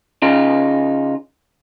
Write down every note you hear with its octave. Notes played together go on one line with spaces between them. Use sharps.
C#3 D#4 F4